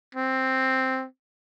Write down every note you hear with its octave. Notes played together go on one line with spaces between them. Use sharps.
C4